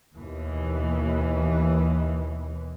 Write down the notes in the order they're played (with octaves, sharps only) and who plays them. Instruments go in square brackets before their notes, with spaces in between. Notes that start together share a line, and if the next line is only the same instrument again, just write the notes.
[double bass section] D#2 B2 E3